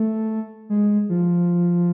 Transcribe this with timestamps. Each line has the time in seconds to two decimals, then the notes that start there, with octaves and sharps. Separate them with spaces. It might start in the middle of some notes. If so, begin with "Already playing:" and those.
Already playing: A3
0.69 G#3
1.09 F3